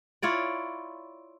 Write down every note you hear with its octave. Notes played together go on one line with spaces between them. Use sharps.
E4 F4 C#5 D5